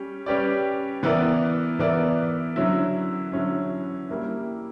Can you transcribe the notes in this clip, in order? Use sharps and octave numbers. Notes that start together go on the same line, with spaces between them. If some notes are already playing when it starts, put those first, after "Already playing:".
Already playing: G3 C#4 G4
G3 C#4 G4 B4 D5
E3 B3 E4 A#4 D5
E3 B3 E4 A#4 D5
D3 F#3 C#4 E4
D3 F#3 C#4 E4
G3 A#3 E4